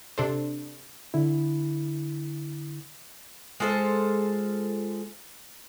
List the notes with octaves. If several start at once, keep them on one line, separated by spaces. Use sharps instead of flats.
C3 D4 A4 C5
D3 E4
G#3 F4 A4 C5